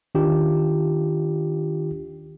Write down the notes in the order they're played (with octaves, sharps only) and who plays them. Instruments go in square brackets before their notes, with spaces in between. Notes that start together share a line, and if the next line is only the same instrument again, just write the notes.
[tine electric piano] D#3 D4 F4 G4